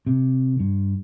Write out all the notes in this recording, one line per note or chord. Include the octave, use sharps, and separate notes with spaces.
C3
G2